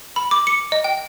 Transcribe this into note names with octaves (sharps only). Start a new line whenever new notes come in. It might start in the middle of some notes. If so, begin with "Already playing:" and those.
B5
D6
C#7
D#5
G5